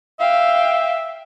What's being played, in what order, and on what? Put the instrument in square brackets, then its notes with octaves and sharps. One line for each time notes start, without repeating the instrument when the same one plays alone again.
[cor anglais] E5 [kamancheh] F5 G5